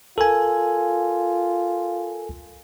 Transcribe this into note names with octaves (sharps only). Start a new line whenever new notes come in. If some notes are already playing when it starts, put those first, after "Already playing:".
F4 A4 A#4 G#5